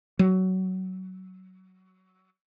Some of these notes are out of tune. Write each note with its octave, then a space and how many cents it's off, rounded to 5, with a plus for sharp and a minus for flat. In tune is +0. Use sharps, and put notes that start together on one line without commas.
F#3 +15